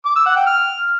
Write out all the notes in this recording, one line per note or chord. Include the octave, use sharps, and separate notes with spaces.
D6
E6
F#5
G5
F6